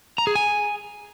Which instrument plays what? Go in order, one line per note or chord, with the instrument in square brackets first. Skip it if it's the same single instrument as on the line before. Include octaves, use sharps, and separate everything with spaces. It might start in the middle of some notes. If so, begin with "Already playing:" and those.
[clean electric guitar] A#5
G#4
G#5